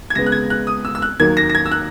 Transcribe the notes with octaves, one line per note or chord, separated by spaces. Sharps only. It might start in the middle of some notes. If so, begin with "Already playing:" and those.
G#6
C#2 C#3 G#3 B3 A#6
F#6
G#6
F#6
D#6
E6
E6
F#6
D#2 D#3 F#3 A#3 G#6
A#6
A#6
G#6
E6
F#6